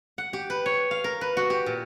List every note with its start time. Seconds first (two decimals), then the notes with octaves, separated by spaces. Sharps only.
0.18 F#5
0.33 G4
0.50 B4
0.66 C#5
0.91 F5
1.04 A#4
1.21 B4
1.37 F#4
1.50 G4
1.66 A#2